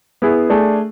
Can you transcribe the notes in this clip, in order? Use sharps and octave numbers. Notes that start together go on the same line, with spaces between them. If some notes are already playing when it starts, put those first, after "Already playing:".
B3 E4 G#4
A3 D4 G#4